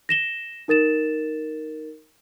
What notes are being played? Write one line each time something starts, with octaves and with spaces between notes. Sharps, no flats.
A#6 E7 G7
D#4 A#4 A6 E7